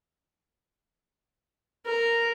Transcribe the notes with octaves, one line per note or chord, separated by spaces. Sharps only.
A#4